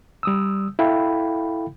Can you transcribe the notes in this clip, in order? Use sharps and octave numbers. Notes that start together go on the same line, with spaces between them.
G3 D#6 E6
E4 A4 F5 G5 B5